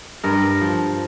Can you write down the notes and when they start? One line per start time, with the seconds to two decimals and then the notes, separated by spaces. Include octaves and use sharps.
0.24 G2 A#4
0.61 F3